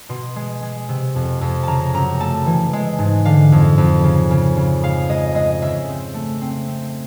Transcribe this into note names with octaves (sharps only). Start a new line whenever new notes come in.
B2 C6
G#3
G#3
C3
F2
F2
C#3 A5 A#5
F#2 A#5
A3 A5
E3
G#3
G#2
D3 F5
F2
F2
C#3
C#3
C#3
G#3 F5
G#3 D#5
G#3 D#5
C#3 E5
C4
A3
C4
C4